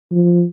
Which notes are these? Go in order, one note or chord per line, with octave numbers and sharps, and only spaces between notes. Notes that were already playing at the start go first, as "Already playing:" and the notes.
F3